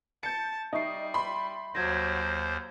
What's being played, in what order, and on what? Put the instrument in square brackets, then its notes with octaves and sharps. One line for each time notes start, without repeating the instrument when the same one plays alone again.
[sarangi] A5 [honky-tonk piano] G6 C#7
[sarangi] G3 [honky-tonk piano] D#4 [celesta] E5 C#6 C7
[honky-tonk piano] B5 C6
[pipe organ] D#2 C5 [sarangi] F#3 [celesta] G#6 A#6